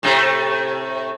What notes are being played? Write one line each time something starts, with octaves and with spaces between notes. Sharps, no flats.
A2 C3 A3